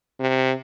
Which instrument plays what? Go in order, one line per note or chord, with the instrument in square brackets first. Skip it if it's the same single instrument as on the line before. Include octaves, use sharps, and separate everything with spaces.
[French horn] C3